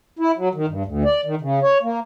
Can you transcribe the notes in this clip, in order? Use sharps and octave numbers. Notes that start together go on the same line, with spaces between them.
E4
F#3
D#3
G2
D2
D5
D#3
C#3
C#5
A#3